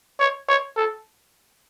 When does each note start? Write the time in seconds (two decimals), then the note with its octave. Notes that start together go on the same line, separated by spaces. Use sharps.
0.20 C#5
0.48 C#5
0.76 A4